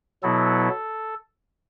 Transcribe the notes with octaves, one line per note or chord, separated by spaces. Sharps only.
B2 F#3 B3 E4 A4